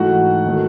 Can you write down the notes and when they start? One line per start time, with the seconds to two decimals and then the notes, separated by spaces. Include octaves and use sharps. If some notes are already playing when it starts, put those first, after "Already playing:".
Already playing: G#2 E3 A3 F#4 F#5
0.46 D#3 F#3 A3